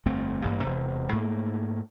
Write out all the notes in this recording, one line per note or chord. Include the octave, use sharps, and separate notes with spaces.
G1 F2 A3 C4
A1 G2 A#3
E1 C3
G#2 A3 A#3